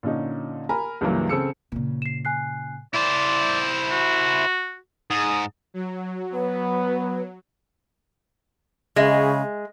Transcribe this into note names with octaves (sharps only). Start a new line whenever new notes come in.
A#2 D3 C#4 D#4
A#4 G#5 A#5 B5
C#2 G2 C#3 E3 F#3 A#3
C#3 C4 A4 E6 C#7
A#2 C#3
C7 E7
G#5 F#6 C7
E4 C5 D5
F#4
G#2 D#6
F#3
B3 B4
C#3 G#3 D#5 E5